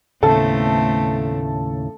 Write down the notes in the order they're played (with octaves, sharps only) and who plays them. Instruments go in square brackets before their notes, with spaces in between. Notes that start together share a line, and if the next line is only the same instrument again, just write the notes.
[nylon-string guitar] D#2 A2 C#3 [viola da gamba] A3 B3 C4 [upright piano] A4